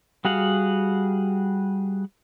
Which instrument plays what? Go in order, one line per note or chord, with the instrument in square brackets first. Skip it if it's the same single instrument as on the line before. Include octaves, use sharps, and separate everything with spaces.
[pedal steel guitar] G3 F#4 G#4 F5 F#5